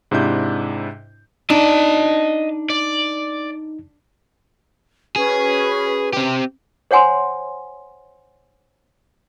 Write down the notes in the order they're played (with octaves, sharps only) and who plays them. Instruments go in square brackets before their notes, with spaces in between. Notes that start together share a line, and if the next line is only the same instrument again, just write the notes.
[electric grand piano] G#2 C3 D4 E4 G6
[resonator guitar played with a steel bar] D4 [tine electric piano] D#4 [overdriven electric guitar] D#5 A5
[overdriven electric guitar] D5
[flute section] C#4 F#4 B4 [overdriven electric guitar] G#4
[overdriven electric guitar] C4 G4
[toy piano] C5 C#5 F#5 G#5 C6